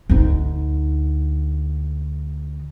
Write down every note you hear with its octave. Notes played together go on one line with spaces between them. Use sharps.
D2 D#4